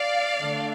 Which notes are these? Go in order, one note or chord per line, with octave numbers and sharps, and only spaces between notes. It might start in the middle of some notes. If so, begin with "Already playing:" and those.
Already playing: D5 F5
D3 A3 D4